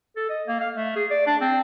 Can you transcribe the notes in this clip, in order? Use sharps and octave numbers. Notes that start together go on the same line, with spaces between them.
A4
D#5
A#3
F5
A3
G#4
D5
D4
C4